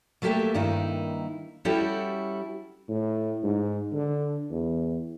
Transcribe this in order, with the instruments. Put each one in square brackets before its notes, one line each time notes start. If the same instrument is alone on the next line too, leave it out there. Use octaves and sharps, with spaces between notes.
[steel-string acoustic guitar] F#3 A3 A#3 G4 A4 E5
G2 D#3 A#3 D#4 E4
G3 C#4 E4 F#4 G4 A4
[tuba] A2
G#2
D3
E2